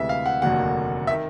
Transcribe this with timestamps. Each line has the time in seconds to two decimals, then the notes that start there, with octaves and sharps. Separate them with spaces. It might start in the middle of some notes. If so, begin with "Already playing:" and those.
Already playing: D2 C3 E3 G#3 E5
0.09 F5
0.26 F#5
0.42 F1 D#2 D3 F#3 A#3 F#5
1.07 E5
1.11 D#3